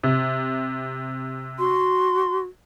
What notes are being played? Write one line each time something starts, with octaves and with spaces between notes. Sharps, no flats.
C3
F#4 C6